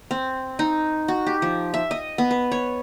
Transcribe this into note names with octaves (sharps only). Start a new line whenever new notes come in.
C4
D#4
F#4
G4
F3
E5
D#5
B3
B4
C#5